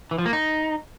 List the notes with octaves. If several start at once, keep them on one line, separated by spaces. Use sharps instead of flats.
E3
F3
A#3
D#4